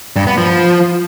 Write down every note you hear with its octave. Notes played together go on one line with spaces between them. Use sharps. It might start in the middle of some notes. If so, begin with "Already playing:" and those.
G2
B3
F3